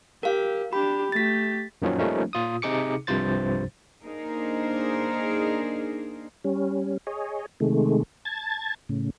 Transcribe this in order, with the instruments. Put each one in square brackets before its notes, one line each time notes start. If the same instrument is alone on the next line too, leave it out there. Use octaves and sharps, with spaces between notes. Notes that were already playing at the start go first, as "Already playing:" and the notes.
[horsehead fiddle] G4 [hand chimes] A#4 F5
[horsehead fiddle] D4 G4 [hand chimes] B5
[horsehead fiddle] A3 G4 [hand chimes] A6 B6
[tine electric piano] F#2 A#2 D#3 F3 F#3 C#4
F3 G3 A3 A#3 C#4 D#4
A#2 F4 D#6
C3 D#4 G#4 D6 C#7
C2 G2 C3 F3 C5 A6
[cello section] A#3 D4 D#4 G#4 A#4 C5
[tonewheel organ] G3 C#4
G#4 C#5 D#5
C3 D#3 G#3 A3
A5 G#6 A6
A2 C#3